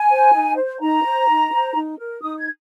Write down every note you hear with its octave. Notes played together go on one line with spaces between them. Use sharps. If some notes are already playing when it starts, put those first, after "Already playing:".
Already playing: G#5
C5
D#4
C5
D#4 A#5
C5
D#4
C5
D#4
A#4
D#4 D#6
G#6